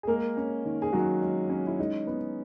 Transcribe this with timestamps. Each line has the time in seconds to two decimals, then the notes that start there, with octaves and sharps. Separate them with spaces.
0.03 G#4
0.07 G#3 A#3 A#4
0.37 C#4
0.65 D#3
0.82 G#4
0.93 D#3 F#3 F#4
1.22 G#3
1.50 C#4
1.67 E4
1.79 G#3 D#4
2.07 B3